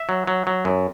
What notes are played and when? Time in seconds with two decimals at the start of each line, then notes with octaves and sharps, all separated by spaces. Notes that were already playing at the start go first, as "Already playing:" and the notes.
Already playing: E5
0.09 F#3
0.27 F#3
0.47 F#3
0.65 F#2